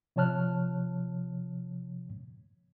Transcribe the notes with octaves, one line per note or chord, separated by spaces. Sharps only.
C3 F3 C#5 A5 F6 F#6